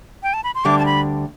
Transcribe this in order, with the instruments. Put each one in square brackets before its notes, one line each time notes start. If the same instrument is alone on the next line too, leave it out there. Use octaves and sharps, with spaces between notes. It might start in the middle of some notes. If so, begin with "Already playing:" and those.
[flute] G5
A5
B5
C6
[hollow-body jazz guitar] D2 D3 G3 D4 [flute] D6
[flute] A5
B5